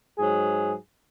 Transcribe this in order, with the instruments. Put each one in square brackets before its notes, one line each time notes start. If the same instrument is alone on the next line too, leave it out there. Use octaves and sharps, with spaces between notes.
[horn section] G#2 F#3 G#4